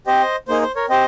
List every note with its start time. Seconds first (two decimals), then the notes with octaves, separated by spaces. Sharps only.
0.07 C4 G4 C5 D#5
0.48 A#3 D#4 G#4 C5
0.62 C5
0.76 A#4 C#5
0.89 C4 G4 C5 D#5